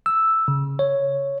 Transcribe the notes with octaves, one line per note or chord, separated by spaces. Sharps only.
E6
C#3
C#5